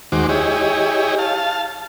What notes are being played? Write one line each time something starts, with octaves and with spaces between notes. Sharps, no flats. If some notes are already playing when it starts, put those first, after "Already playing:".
D#2 D#3 G#3 F#4 C5 D6
E4 G4 G#4 C#5 D#5
F5 A5